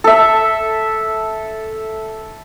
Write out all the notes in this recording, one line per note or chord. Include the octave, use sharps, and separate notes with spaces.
A4 E5